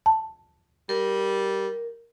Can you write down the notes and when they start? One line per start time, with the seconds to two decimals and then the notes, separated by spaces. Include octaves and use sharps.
0.06 A5
0.89 G3 A#4